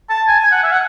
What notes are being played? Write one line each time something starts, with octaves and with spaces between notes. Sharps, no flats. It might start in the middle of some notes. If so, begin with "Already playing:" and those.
A5
G#5
G#5
F#5
E5
F#5